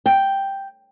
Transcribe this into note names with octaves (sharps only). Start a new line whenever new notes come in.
G5